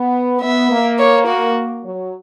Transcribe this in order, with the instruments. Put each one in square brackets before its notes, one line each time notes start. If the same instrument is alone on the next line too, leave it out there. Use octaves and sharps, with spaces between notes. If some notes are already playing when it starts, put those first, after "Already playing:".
Already playing: [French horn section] B3
[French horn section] B3 [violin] E5
[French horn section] A#3
[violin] C#5
F#4
[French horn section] F#3